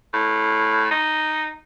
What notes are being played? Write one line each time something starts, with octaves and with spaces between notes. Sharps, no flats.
A2
D#4